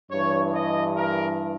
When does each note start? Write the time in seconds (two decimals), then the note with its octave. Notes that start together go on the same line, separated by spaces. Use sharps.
0.11 G2 E3 C#5
0.54 D#5
0.97 A#4